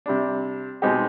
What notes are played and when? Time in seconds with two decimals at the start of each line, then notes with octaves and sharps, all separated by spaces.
0.06 C3 G3 D4
0.82 B2 G#3 C4 D#4 G4